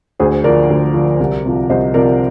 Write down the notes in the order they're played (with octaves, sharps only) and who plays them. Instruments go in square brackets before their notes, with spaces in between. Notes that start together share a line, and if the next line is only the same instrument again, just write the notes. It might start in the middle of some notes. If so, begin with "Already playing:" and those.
[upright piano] D2 G#4 C5
D3 F3 A#4 D5
D2
D3 F3
C2
C3 F3
C2 C5 D#5
C3 F3 A#4 D5